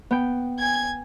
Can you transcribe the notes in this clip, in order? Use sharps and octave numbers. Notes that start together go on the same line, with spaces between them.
B3 G5
G#5 G#6